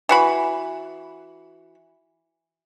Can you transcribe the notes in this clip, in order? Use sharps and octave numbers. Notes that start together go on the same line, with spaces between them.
E3 F#4 B5